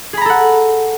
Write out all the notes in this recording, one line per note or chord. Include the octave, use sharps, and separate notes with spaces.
G#4 A4 F#5 A#5 B5